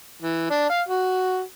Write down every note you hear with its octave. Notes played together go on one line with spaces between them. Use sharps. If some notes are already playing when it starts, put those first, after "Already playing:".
E3
D4
F5
F#4